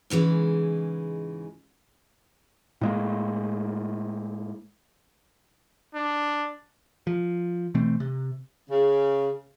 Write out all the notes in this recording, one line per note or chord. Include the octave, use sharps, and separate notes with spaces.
G#2 C#3 E3 G#3
A2 G#3 A#3
D4
F3
B2 E3 A3 C4
C3
C#3